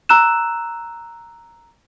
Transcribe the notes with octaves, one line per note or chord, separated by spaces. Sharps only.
A#5 E6 F#6 E7